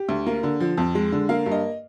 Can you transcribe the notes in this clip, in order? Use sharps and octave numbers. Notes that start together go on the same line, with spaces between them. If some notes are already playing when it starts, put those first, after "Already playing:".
Already playing: G4
D2
A#3
D3
F3
F2
G#3
D3
A#3 F5
G2
D#5